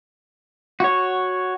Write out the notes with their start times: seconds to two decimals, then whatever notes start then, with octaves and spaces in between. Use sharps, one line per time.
0.80 F#4 C#5